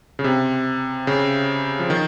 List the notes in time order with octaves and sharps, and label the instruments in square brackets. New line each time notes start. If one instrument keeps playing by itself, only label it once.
[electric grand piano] C#3
C3
C#3
F3
D#3